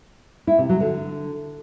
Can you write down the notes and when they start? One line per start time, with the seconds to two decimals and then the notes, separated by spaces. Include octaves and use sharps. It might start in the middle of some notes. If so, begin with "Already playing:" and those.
0.47 E4
0.58 C3
0.69 F#3
0.80 D3